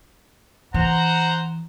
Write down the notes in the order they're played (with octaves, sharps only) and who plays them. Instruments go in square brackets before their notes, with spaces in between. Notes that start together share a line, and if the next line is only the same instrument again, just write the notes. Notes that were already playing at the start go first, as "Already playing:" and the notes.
[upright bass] E3 [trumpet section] C5 F#5 A#5